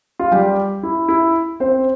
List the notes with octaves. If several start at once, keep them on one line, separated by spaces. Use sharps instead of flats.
F4
G3 G4
E4
E4
C4 C5